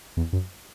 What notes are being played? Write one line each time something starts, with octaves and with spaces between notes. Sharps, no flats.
E2
F#2